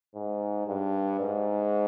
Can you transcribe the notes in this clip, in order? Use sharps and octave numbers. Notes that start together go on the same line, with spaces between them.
G#2
G2
G#2